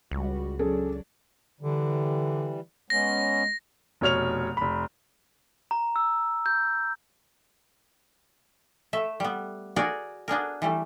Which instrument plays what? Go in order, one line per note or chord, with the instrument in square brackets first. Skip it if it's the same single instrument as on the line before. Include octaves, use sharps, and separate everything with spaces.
[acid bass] C#2 [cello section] G3 F#4
[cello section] F#3 D4 [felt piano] C#4 G#4 A4
[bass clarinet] D3 [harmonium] E3 G3
[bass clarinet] G#3 [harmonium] B3 C#4 [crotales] A#6
[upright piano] F1 B2 C#5 F6 F7
F1 B5
[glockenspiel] A#5
E6
G6
[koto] A3 E5
G3 B3
F#4 G#4 A#4 D5
B3 D4 G#4 A#4
E3 G3 A3